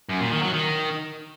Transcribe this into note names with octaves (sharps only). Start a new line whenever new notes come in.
F#2
A#2
D#3
F#3
D#3